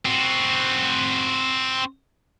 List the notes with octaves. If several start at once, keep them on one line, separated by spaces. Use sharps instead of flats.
C4 F#4